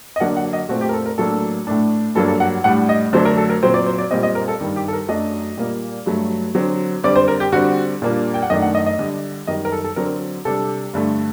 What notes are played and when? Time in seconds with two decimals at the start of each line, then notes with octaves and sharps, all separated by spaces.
0.16 D#5
0.20 D3 F#3 A#3 D4 F#5
0.37 F#5
0.53 D#5
0.69 A#2 A3 C4 F#4
0.81 G4
0.89 A#4
0.93 A4
1.06 A#4
1.18 A2 F#3 A#3 D4 A4
1.67 A2 A3 D4
2.15 G2 F#3 A#3 D4 A4
2.28 A4
2.40 F#5
2.64 A2 G3 D4 F#5
2.89 D#5
3.13 D3 F#3 A3 D4 C5
3.25 A#4
3.37 A4
3.50 A#4
3.63 A#2 F#3 C4 C5
3.74 D5
3.86 C5
3.99 D5
4.11 A#2 G3 C4 D#5
4.23 D#5
4.35 A#4
4.48 A4
4.60 G2 D#3 G3
4.76 G4
4.88 A4
4.93 A#4
5.08 F#2 F#3 A3 D4 D#5
5.57 A#2 G3 A#3
6.06 G2 F#3 A3
6.55 D3 F#3 C4
7.04 D3 G3 C4 D5
7.16 C5
7.28 A#4
7.40 G4
7.52 D3 G3 C4 F#4
8.02 A#2 G3 A#3 D4
8.34 G5
8.42 F#5
8.50 F#2 D#3 A3 D4 D#5
8.62 F#5
8.75 D#5
8.86 D#5
8.99 D3 G3 D4
9.47 F#2 D#3 G3 D#5
9.65 A#4
9.72 A4
9.84 A4
9.96 D3 F#3 C4 A#4
10.45 C3 G3 D4 A4
10.94 G2 D3 A3